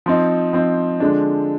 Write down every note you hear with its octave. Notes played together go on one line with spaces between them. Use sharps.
F3 C4 D#4
F3 C4 D#4
D3 F3 G#3 D4